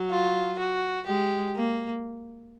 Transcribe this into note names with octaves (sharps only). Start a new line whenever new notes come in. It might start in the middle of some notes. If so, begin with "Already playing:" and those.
Already playing: F#3
F4
F#4
G#3 G4
A#3